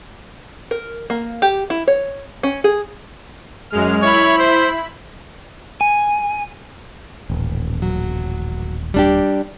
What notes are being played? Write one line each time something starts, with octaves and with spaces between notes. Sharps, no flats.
A#4
A#3
G4
E4
C#5
C#4
G#4
F#2 G#3 F6
E4 C#5 B5
C5
G#5
D#1 A1
F#3
G3 D4 G4